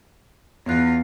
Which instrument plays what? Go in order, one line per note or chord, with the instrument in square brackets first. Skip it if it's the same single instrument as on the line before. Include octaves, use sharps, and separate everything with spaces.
[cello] E2 F4 [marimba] B3 F#6